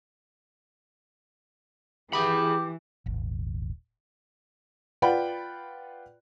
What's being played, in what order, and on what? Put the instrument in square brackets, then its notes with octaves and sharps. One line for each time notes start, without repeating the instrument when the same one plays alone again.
[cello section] E3 [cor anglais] G4 [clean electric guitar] G#4 B5
[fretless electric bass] D#1 G#1
[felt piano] F4 B4 D5 F#5 G5 B5